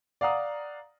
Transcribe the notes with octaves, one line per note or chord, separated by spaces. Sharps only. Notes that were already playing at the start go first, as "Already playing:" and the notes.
D5 F5 F#5 A#5 D#6